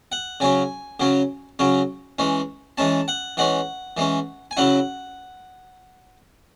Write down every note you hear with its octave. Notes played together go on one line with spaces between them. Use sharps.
F#5
C#3 F#3 C#4 G#5
C#3 F#3 C#4
C#3 F#3 C#4
E3 G#3 C#4
E3 G#3 C#4 A5
F#5
E3 G#3 C#4 F#5
E3 G#3 C#4
G#5
C#3 F#3 C#4 E4 F#5